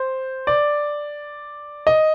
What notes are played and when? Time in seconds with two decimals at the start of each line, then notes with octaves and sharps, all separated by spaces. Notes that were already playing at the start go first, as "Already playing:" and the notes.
Already playing: C5
0.47 D5
1.87 D#5